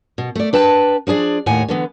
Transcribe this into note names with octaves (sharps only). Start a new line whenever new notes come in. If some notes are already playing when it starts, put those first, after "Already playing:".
B2
A3 D5
D4 B4 G5 A5
F3 D4 G#4 D5
D#2 A2 F#5 G#5
D3 E3 B3